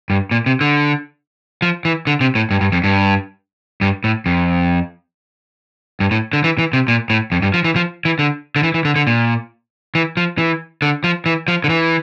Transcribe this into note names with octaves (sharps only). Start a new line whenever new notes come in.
G2
A#2
C3
D3
F3
E3
D3
C3
A2
G2
G2
F2
G2
G2
A2
F2
G2
A2
D3
E3
E3
C3
A#2
A2
F2
G2
F3
E3
F3
E3
D3
D3
E3
E3
D3
D3
A#2
E3
F3
E3
D3
F3
E3
F3
D3
E3